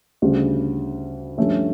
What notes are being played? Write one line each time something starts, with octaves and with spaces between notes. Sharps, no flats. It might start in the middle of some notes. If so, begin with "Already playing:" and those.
D2 C#3 G3 D4
G2 F3 A3 C#4